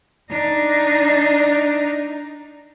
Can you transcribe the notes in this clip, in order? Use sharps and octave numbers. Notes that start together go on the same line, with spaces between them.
D4 D#4